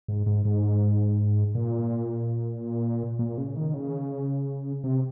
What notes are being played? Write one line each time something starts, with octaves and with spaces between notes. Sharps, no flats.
G#2
G#2
G#2
A#2
A#2
C#3
D#3
C#3
C3